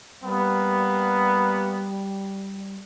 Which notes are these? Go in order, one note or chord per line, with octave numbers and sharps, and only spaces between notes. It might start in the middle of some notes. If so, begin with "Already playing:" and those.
G3 A#3 B3